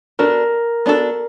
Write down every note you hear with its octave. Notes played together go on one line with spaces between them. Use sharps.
B3 D4 F#4 A4 A#4
B3 D4 F#4 A4